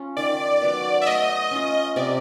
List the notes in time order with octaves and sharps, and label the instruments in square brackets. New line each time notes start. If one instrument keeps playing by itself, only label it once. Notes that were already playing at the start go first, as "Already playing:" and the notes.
Already playing: [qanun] C#4 F4
[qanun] D#3 [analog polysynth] D5
[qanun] F#3 B3
[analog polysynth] E5
[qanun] A3 [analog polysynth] D#5
[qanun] C#4 F4
[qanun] C3 [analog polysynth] D5